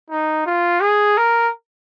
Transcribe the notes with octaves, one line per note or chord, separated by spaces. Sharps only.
D#4
F4
G#4
A#4